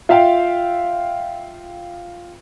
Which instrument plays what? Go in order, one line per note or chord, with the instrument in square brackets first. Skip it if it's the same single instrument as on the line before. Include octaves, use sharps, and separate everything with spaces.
[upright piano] F4 E5 F5 G5